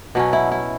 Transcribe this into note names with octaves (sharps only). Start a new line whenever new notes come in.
B2 F#3 C#4
E4
E4